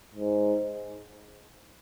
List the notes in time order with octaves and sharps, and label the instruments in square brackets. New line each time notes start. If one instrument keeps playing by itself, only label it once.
[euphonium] G#2